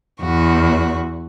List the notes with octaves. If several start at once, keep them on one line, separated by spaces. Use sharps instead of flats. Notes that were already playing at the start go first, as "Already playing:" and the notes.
E2 F#4